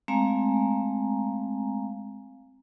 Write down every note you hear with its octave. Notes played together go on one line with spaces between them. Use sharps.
G#3 A3 C4 F5 G#5 A#5